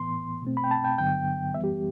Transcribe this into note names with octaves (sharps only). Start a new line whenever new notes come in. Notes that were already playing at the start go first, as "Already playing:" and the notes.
Already playing: A2 E3 B3 C6
B2 A3 C4
B5
G5
A5
G5
G2 D3 F#3 B3 G5
F#2 E3 G3 B3 E5
G4